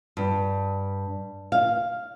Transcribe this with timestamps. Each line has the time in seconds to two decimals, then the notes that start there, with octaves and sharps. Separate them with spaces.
0.17 G2
1.52 F5